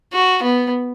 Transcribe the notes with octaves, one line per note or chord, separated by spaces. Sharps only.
F#4
B3